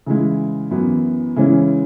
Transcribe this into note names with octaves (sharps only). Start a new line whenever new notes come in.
C#3 E3 G#3 E4
F#2 E3 B3 E4
C#3 E3 G#3 C#4 E4